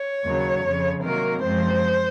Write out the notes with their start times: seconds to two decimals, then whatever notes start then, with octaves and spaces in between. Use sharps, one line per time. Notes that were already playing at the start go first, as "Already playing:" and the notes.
Already playing: C#5
0.25 D#2 C#3 F#3
0.63 F2 C#3 F3
1.02 C3 D#3 F#3 A#3 A#4
1.42 F#2 F3 G#3 C4 C5